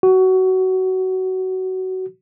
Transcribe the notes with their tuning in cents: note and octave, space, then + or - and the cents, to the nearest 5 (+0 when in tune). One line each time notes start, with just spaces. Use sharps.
F#4 +20